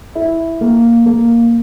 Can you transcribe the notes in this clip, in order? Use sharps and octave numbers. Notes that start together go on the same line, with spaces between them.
E4
A#3
A#3